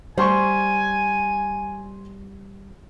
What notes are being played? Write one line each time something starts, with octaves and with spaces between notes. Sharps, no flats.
G3 C5 G#5 C6 C#6